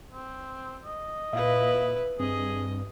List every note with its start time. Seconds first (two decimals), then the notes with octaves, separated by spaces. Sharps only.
0.13 C4
0.85 D#5
1.33 A#2 E4 B4 E5 F5
2.20 G2 C4 G#4 D#5